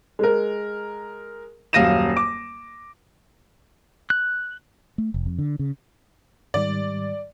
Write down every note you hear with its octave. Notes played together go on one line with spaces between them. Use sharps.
G#3 A#4
D#1 F#2 F5 A#6 D#7 E7
D6
F#6
A3
F1
F2
D3
C#3
G#2 D#3 G3 D5